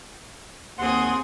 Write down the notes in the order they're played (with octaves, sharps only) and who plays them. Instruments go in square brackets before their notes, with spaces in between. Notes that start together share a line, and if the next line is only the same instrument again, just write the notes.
[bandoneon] D#2 F#5 C6 [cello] C4 G#4